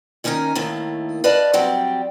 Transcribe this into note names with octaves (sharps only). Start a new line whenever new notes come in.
D#3 C#4 D#4 A#4 G#5
A2 D#3 A3 A#3
B4 D5 D#5 F5 A5
F#3 G3 C4 D5 G5